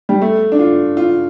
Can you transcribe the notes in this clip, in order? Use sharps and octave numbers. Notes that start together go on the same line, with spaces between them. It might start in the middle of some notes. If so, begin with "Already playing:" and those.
G3
A3
D4
F4
F4